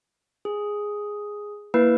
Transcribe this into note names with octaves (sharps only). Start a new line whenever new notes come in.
G#4
A#3 E4 B4